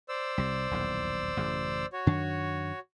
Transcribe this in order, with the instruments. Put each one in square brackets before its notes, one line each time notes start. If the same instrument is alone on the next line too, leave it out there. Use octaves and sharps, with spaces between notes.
[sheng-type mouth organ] C5 D5 E6
[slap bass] C2 C3
D#1 B1 E2
A1 F#2 C#3
[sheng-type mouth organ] F#4 C#5
[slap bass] F#2 D#3 D4